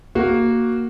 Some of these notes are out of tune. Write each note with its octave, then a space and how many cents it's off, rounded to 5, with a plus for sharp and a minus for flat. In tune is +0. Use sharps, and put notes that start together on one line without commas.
A#3 +0 F#4 +0